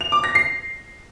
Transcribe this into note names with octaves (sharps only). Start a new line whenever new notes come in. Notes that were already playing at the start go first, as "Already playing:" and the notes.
F7
D6
A#6
C7